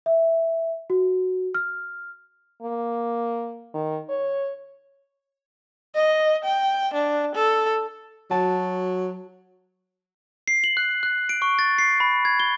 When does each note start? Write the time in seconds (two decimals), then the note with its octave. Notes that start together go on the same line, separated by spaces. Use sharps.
0.06 E5
0.90 F#4
1.55 F6
2.62 A#3
3.74 D#3
4.10 C#5
5.95 D#5
6.44 G5
6.94 D4
7.35 A4
8.31 F#3 F#4 A5
10.48 C7
10.64 F#7
10.77 F#6
11.03 F#6
11.29 D7
11.42 C#6
11.59 A6
11.78 C7
12.00 B5
12.25 G#6
12.40 G7